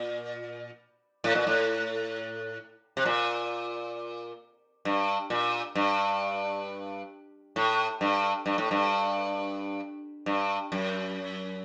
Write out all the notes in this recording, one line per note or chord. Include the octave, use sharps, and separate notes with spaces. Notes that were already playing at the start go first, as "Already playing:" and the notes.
Already playing: A#2
A2
A#2
A2
C3
A#2
G2
A#2
G2
A2
G2
G2
A2
G2
G2
F#2